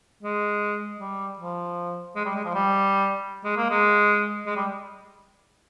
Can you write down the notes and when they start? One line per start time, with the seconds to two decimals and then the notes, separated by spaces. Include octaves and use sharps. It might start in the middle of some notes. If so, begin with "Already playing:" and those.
0.23 G#3
1.00 G3
1.39 F3
2.16 G#3
2.25 G3
2.35 G#3
2.45 F3
2.55 G3
3.44 G#3
3.57 A#3
3.70 G#3
4.46 G#3
4.56 G3